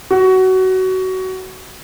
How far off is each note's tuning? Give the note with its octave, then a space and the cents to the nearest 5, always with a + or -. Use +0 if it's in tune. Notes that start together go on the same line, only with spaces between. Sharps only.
F#4 +20